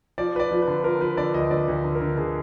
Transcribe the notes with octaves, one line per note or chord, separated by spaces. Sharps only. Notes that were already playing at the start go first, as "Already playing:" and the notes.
F3 D5
F3 B4 D5
F3
B4
D3
F3 A#4
F3 B4
D3 D5
D2 D#5
D2 D5
D2
B4
D3
A#4
D3
D3 G#4